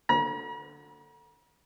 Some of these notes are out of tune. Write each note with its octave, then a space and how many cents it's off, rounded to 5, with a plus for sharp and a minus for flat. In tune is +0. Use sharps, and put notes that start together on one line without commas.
D3 +10 A#5 +45